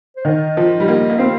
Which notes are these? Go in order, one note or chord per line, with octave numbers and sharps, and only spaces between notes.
C5
D#3 D#5
F3
G3
A#3
A#3
C4 F5